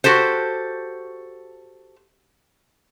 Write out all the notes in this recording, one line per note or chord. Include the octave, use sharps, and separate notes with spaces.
F#4 G4 A4 C5